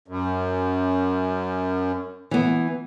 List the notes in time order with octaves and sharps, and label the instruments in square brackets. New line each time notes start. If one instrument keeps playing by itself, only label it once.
[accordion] F#2
[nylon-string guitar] E3 B3